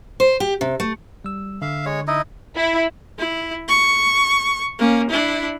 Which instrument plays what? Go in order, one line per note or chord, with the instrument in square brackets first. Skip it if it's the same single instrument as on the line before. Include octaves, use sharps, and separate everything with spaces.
[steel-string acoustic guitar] C5
G4
C3
A3
[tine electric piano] G3 E6
[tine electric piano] D3 [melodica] E5 F5
[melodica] G#3 C#5
D#4 E4 D#5
[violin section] E4
[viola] E4
C#6
A#3 C#4
D4 E4